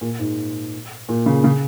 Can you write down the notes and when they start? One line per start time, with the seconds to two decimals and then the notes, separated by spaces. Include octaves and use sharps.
0.01 A#2
0.19 G#2
1.09 A#2
1.26 C#3
1.44 C#3